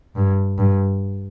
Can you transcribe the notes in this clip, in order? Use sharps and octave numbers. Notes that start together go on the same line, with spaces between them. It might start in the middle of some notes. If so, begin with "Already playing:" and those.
G2
G2